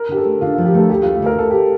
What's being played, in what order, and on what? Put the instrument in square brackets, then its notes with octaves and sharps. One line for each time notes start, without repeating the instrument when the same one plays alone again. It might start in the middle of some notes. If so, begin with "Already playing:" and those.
Already playing: [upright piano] A#4
[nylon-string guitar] D3 [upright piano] G4
[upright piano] A4
[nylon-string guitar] A3
[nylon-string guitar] D3 [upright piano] F4
[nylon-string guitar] F3 [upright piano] F4
[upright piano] G4
[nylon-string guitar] A3 [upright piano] A4
[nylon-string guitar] D2 [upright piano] G4
[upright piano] F4
[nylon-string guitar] A3
[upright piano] F4
[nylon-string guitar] D2 [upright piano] A#4
[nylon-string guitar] D2 [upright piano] A4
[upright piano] G4